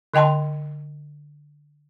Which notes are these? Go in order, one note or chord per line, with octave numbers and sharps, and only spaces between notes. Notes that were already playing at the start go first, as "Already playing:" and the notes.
D3 D#5 G5 A5 C6